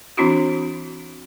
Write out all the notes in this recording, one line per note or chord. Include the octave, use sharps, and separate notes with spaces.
E3 C4 D4 E4 F#4